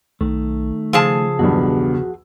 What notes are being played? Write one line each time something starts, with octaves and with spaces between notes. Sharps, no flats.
B1 D#3 A3
C#3 F3 G#4 A5 E6
B1 E2 G2 F#4